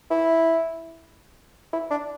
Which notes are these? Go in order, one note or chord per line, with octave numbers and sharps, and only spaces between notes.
E4
E4
D4